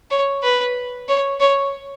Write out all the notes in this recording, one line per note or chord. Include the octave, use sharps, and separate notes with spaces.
C#5
B4
C#5
C#5